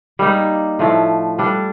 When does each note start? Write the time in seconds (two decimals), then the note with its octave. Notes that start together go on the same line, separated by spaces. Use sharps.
0.19 G3 A#3 D#4 A#4
0.79 A2 F3 A3
1.39 G3 D4 A4